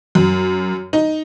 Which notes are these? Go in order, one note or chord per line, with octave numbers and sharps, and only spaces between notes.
F#2
D#4